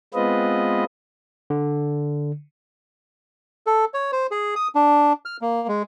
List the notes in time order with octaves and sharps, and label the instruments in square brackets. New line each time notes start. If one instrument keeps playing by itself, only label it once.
[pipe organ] G#3 B3 C4 F4 B4 D#5
[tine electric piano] D3
[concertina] A4
C#5
C5
G#4
D#6
D4
F6
A#3
G#3